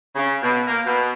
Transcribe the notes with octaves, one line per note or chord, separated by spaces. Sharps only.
C#3
B2
A#3
B2